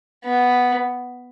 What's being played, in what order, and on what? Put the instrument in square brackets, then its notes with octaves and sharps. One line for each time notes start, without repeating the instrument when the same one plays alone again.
[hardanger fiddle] B3